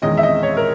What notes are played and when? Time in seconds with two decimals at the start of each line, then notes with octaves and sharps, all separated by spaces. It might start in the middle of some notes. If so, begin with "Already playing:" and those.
0.02 E2 D#3 G#3 C#4 D#5
0.17 E5
0.23 D#5
0.43 C#5
0.57 A#4